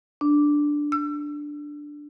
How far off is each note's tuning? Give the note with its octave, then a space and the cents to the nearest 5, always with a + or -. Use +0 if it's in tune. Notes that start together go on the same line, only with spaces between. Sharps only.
D4 +0
E6 +35